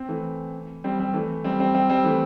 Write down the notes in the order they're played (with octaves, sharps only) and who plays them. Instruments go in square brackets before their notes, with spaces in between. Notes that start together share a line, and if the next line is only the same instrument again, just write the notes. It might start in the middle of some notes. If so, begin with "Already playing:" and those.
Already playing: [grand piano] C4
E3 A3
G3 C4
G3 C4
E3 A3
G3 C4
G3 C4
G3 C4
G3 C4
E3 A3